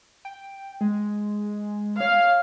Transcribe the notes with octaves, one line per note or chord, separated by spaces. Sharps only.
G5
G#3
C#5 F5